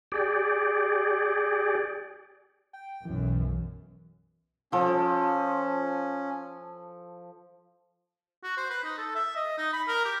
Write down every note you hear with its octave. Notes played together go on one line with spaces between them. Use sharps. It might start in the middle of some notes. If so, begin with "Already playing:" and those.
G4 G#4 D5
G5
B1 F#2 E3
F3 C#4 A4
F#4
C5
B4
D#4
A4
E5
D#5
D#4
B5
A#4
G4